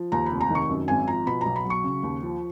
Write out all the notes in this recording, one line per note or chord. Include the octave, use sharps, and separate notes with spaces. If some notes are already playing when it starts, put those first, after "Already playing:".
Already playing: F3
D#2 A#5
F1 B5
A#5
D#3 C#6
F#2
G#1 G#5
F3 A#5
B2 B5
B1 A#5
B5
F#3
C#6
C#3
D#2
F3